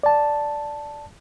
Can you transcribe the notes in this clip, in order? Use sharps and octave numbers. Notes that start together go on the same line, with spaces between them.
D5 A5